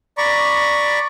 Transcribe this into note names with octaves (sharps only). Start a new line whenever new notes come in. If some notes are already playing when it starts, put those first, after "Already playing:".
D5 A#5 B5 C#6